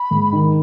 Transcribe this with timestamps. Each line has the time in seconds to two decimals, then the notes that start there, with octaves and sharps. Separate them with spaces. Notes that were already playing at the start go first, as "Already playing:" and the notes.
Already playing: B5
0.11 G#2
0.33 D#3